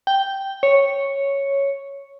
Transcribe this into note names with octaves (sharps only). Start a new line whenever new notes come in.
G5
C#5